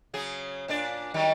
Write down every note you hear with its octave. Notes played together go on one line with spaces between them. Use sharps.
C#3 F#3 G#4
A#2 D4 D5
D#3 F#3 G3